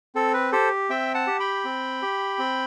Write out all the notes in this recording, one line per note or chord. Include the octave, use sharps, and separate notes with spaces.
C4 A4
B4
G4 A4 C5
C4 E5 G5
F#5 A5
G4
G5 B5
C4
G4
C4